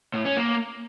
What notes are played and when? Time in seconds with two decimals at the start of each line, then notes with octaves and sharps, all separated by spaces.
0.14 A2
0.25 C#4
0.37 A#3